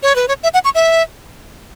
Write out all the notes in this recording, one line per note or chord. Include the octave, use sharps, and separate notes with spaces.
C#5
B4
C#5
E5
F#5
C#6
E5